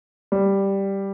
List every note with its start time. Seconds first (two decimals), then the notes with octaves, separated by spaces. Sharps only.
0.32 G3